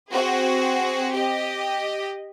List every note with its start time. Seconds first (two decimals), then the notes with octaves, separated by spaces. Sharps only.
0.12 C4 F#4 G#4
1.15 G4 D#5